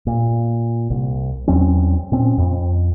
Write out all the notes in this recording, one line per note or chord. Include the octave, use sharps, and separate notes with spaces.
A#2
C2
E2 F#3 C4 C#4
A#2 C4 C#4
F2